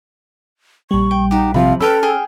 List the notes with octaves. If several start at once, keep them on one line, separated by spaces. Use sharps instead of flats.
A#1 G3 C#6
G5
D#4 F#4 G4
C3 F3 F5 B5
C#4 A4 B4 G5 B5 E6 F6
G#4 G5